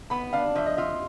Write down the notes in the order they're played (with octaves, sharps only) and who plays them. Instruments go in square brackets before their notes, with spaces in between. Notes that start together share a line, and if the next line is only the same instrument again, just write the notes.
[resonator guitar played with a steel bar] B3 [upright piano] B5
[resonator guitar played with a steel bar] D4 [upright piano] F5
[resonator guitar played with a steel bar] F3 [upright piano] E5
[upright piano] D#5
[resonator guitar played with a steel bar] F4 [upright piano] E5